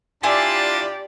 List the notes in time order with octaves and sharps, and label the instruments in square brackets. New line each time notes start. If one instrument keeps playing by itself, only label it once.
[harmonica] D4 F4 A5 [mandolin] E4 G#5 C6 [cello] G4 D5